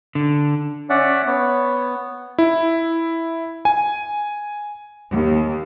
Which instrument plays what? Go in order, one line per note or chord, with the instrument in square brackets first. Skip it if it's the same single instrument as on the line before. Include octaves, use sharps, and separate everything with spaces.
[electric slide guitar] D3
[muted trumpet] C#4 [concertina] D5 E5 F#5
[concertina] B3 [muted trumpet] C#5
[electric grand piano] E4
G#5
[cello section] D#2